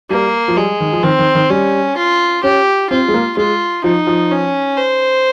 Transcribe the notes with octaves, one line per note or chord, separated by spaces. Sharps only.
G3 A#3
F3
G3 G#3
D#3
F3
D#3 C4
D#3
D#3
G3 C#4
F4
C#4 G4
C4 F4
G#3
A#3
G#3 F4
F3 D#4
F3
C#4
C5